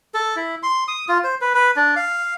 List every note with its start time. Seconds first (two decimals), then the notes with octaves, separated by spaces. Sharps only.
0.14 A4
0.36 E4
0.63 C6
0.88 D#6
1.08 F4
1.24 C5
1.41 B4
1.54 B4
1.76 D4
1.96 F5